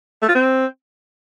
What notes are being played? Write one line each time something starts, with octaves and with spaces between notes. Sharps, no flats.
A3
F4
C4